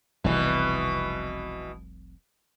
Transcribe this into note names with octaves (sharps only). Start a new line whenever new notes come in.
F1 C2 B2 E3